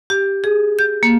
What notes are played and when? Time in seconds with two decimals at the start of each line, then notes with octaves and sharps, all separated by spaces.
0.10 G4
0.44 G#4
0.79 G6
1.03 A#3